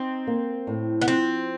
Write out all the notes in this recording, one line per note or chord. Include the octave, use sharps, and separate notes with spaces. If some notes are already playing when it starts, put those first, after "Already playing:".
Already playing: C4 D#4
A#3
A2
B3
F3 C4